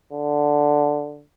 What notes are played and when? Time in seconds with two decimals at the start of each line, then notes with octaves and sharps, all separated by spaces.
0.13 D3